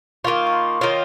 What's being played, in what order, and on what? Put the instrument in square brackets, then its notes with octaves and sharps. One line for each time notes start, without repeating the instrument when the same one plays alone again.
[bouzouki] D#3 A#3 F4 [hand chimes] C#6
[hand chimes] C#6
C6
[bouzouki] D#3 A#3 F4 [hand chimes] C#5